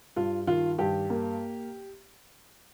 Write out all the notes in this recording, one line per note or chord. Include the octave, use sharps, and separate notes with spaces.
G2 F4
D#3 F4
G2 G4
A#3